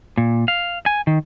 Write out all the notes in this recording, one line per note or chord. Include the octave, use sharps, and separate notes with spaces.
A#2
F5
G#5
D#3